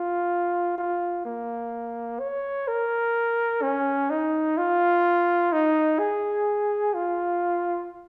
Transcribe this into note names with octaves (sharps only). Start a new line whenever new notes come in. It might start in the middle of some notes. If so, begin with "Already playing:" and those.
Already playing: F4
F4
A#3
C#5
A#4
C#4
D#4
F4
D#4
G#4
F4